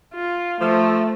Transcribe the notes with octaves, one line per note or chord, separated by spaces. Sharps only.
F4
F3 A3